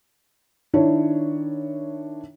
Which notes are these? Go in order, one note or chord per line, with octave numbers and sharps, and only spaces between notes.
D#3 D4 E4 C#5